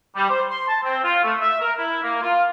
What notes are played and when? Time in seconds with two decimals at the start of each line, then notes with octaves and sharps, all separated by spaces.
0.16 G3
0.30 C5
0.51 C6
0.68 A5
0.84 C4
1.04 F4
1.23 A3
1.40 E5
1.61 A#4
1.78 E4
2.03 A#3
2.22 F4